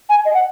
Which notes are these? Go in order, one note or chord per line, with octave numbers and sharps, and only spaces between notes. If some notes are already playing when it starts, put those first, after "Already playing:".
G#5
D#5
F#5